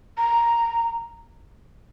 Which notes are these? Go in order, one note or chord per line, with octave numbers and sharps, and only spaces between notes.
A#5